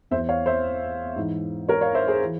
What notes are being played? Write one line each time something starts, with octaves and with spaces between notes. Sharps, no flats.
E2 E3 C5 E5
C#5 F5
C5 E5
G#2 E3
A#4 C#5
C#5 F5
C5 E5
G#4 C5
E3